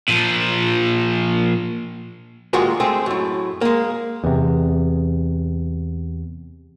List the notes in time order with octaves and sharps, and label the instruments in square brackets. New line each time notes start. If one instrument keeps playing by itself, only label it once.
[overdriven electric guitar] A#2 F3
[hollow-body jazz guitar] D#2 A#2 G#3 F4 F#4 G#4
G#3 A3 C4
F#2 A2
G#3 A#3
[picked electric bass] E2 C3